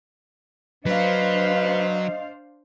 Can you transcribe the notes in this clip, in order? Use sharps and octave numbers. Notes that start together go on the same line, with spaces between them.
F#3 D4 B4 C5 D#5 F5